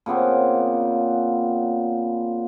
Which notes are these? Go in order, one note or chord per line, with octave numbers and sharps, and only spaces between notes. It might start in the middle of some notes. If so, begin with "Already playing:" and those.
A#2 C#3 B3 C4